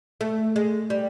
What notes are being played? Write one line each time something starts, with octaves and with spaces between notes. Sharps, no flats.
A3
G#3
G3